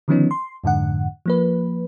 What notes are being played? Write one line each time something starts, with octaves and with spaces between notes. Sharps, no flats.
D3 D#3 F3 B3 C#4 D#4
C6
F2 G#2 D3 F#5
F3 A#3 B4